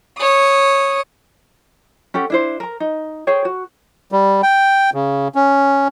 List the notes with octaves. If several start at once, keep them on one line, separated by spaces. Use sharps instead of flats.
C#5 D#6
C#4 G4 A4 F#5
D4 E4 C5
A#4 A#5
D#4
G#4 C5 C#5 G5
F#4
G3
G5
C#3
C#4